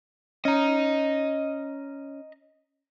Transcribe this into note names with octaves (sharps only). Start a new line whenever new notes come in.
C#4 D#5 A#5